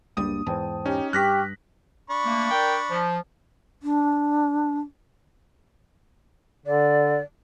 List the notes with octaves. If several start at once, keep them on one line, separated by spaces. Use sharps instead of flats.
F#1 C#2 G3 A#3 D4 D#6
E2 G#2 E3 C5 G5 A5
C#4 D#4 G4
G2 G4 C#6 D6 F6 F#6 A#6 B6
D4 B5 C#6
A3 A#3
A#4 D5 G5
F3
D4
D3 D5